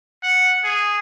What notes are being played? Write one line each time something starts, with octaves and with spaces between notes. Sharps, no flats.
F#5
G#4